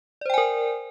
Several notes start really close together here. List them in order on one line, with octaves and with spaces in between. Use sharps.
D5 C5 G5 G#5 A#4